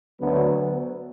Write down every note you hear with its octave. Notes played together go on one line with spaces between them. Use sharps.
D2 D3 F#3 B3